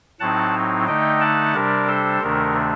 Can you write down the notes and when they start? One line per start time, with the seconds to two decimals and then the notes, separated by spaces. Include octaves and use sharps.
0.20 A2 F#3 C4 D#4 F#5 A5
0.87 D3 A3 D#4 D#5 G5
1.21 F#5 A5
1.54 C3 G3 D4 A#4 D5
1.87 A4 C5
2.21 D2 C3 D#3 A3 D4 A#4